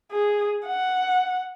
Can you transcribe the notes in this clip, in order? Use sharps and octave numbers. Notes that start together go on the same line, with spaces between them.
G#4
F#5